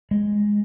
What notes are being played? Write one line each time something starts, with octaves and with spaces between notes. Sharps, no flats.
G#3